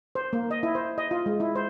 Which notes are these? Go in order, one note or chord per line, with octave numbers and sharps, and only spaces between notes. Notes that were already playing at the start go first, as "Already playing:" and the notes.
C5
A#3
D#5
E4
C5
D#5
F4
G#3
E4
C5